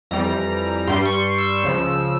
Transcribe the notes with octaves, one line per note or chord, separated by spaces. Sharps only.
F2 E3 G3 A#5
G2 G3 C6
C#6
C6
E6
C#2 C#3 F3